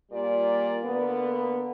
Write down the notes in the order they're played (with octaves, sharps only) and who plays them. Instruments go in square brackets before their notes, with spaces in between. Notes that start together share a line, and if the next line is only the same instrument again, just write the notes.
[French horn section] A#2 G3 A#3 F4 D5
D3 A#3 B3